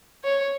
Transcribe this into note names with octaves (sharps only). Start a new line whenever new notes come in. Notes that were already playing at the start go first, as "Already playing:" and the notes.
C#5